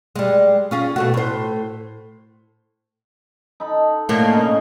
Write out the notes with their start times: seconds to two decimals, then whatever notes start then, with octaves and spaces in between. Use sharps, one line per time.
0.16 G3 G#3
0.71 C#4 F4 G#4
0.96 B2 A3 F#4
1.14 A2 C5
3.60 D#4 A4 B5
4.09 A2 D3 A#3
4.31 C#3 D#4